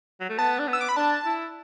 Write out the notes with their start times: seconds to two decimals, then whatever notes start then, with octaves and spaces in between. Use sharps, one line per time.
0.21 F#3
0.29 A3
0.38 B3 A5
0.59 D4
0.67 B3
0.73 E6
0.81 D6
0.89 B5
0.97 D4 A5
1.25 E4